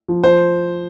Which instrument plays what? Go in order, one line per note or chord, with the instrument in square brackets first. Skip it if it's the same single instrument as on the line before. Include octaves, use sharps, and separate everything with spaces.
[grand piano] F3
F3 C5